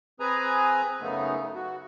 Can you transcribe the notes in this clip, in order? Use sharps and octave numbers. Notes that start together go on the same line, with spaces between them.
C4 G#4 B4 G#5 A#5
F#2 C#3 A3 B3 D#4
F#4